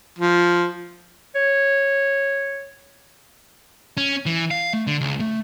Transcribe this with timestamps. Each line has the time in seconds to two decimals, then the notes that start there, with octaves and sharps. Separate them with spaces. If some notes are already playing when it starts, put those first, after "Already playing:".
0.19 F3
1.35 C#5
3.97 C#4
4.26 E3
4.51 F5
4.73 A3
4.87 D3
5.01 C#2
5.20 A3